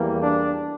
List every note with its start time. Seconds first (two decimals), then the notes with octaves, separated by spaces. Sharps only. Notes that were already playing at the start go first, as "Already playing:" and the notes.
Already playing: E2 E3 G3 A#3
0.21 D4